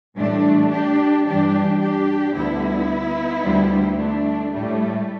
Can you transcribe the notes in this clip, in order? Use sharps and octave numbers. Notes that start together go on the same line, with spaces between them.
A2 E3 G3 A3 D4
D4 G4
G2 E3 G3 D4 G4
D4 G4
D2 D3 G3 B3 E4
D2 D3 G3
A3 D4
A2 G3 A3